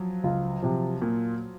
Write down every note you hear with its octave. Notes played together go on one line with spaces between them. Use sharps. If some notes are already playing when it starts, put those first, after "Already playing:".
Already playing: F3 F#3
C#2 F4
C3 F3
A#2